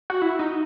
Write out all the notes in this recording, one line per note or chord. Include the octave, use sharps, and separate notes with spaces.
F#4
E4
D#4